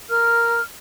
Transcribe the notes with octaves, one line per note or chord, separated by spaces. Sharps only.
A#4 F6